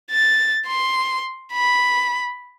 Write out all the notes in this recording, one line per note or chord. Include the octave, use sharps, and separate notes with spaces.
A6
C6
B5